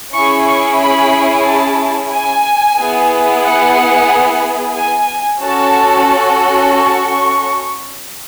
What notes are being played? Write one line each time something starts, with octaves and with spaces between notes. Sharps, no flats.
C#4 E4 G#4 C#6
C#6
B5
A5
G#5
B3 E4 G#4
F#5
G#5
C#4 F#4 A4 A5
C#6